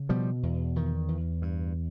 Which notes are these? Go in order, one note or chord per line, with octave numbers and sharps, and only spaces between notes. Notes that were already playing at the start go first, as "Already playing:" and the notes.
Already playing: C#3
B2 F3 G3
E2
E2 D#3
E2
G2